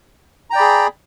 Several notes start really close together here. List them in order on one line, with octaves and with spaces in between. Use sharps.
A#5 G5 D5 B5 G#4